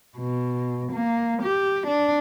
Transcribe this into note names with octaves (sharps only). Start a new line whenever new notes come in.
B2
A#3
G4
D4